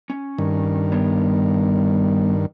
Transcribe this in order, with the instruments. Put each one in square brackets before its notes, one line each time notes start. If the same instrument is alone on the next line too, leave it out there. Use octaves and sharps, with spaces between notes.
[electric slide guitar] C#4
[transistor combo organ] G2 D#3
[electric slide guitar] G3 B3 C#5